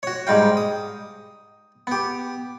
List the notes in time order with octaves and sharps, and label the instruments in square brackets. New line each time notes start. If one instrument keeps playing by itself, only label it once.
[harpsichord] F#4 C#5
G#2 G3 F5 G5
D#6
B3 G4